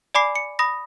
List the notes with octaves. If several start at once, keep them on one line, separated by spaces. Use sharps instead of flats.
D5 G#5 B5 D6 C7
C#7
B5 D#6 A#6